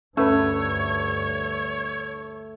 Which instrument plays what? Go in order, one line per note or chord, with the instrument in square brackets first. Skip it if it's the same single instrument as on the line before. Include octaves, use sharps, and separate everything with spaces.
[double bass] D2 G2 [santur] A3 [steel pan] C#4 B4 [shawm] C#5